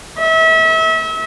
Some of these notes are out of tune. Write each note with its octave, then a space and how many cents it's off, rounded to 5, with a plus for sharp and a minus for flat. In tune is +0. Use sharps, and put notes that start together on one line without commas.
E5 -35